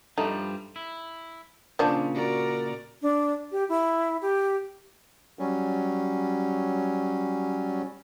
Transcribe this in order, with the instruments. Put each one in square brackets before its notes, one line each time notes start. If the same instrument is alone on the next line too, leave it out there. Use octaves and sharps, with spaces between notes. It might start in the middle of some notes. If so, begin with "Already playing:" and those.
[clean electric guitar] G2 F3 G3 [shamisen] A3 D#4
[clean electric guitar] E4
[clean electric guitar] A#2 C#3 C#4 [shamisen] F3 D4
[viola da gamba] F#4 A#4 D5
[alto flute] D4
G4
E4
G4
[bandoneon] F#3 G3 C#4